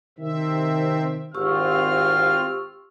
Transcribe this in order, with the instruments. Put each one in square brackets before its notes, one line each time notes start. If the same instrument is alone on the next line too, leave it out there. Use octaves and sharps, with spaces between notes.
[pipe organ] C3 C4 E5 [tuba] D#3
[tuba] G#1 [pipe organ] C4 F4 [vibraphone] G4 C#6 E6 [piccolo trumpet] F6